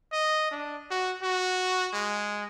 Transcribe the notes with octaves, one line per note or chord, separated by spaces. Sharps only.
D#5
D4
F#4
F#4
G#3